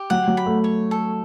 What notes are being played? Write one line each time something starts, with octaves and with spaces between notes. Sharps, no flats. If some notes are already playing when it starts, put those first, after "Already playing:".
Already playing: G4
F#3 F#5
F#3
B5
A3
C#5
A4